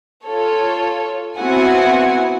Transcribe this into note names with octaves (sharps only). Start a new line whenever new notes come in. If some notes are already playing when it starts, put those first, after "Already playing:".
F4 A4 C#5
B3 C4 E4 F#4 F#5 G#5